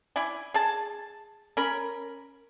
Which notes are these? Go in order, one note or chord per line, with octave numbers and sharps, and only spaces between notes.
E4 D5 G#5
G#4 A5
C#4 A#4 B5